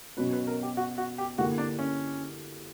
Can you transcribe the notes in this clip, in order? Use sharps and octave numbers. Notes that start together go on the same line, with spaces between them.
B2 F#3 C#4 B4
B4
A#4
G4
F#4
F#4
G4
D3 A#3 E4 F#4 G4
D4
C#4